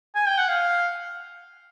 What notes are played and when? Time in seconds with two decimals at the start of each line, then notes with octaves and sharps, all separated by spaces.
0.15 G#5
0.27 G5
0.38 F#5
0.49 F5